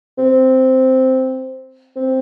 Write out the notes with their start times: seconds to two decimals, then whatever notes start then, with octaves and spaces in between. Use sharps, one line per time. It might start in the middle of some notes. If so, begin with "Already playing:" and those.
0.18 C4
1.96 C4